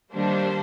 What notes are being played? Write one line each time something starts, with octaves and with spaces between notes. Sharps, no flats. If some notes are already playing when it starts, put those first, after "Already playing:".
D#3 G3 A#3 D4 C5